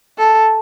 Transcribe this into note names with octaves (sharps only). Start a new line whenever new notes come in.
A4